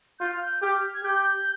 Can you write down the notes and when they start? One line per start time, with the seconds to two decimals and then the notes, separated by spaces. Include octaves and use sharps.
0.19 F4 G6
0.31 F6
0.42 G6
0.62 G4 F6
0.94 G#6
1.03 G4 G6